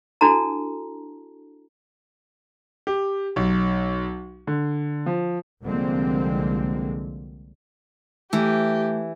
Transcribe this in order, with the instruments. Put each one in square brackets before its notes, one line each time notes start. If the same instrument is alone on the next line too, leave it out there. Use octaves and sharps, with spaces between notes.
[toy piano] D4 E4 F#4 A4 A5 A#5
[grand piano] G4
B1
D3
F3
[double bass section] C2 D3 F3 G#3 A#3 C4
[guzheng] E3 [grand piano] A3 [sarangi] G4